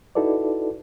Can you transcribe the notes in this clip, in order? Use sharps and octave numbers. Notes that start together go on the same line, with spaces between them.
D#4 E4 F#4 A4 B4 D5